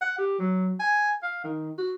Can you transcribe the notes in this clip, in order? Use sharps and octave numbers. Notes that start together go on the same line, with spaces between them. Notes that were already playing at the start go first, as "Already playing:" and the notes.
F#5
G4
F#3
G#5
F5
D#3
F#4